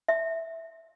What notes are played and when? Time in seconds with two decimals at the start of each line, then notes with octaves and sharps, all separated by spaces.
0.08 E5